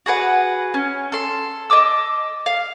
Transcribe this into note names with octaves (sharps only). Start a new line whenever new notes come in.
F#4 G#4 B4 F#5
C#4
A4 C6
D#5 A5 D6 E6
F5